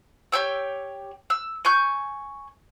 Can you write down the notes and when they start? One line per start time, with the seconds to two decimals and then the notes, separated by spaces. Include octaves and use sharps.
0.32 G4 C#5 G5 E6
1.30 E6
1.65 G#5 C#6 G6